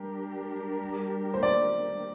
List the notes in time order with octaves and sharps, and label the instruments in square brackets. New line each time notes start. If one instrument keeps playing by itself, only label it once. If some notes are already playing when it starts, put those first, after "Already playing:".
Already playing: [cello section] G3 D4 G4 A#4
[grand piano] C5
D5